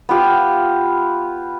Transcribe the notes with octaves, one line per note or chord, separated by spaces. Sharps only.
B3 F4 G4